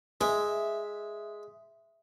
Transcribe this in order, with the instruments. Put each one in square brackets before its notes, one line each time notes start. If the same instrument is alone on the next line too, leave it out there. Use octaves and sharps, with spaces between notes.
[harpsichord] G#3 [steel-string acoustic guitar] E5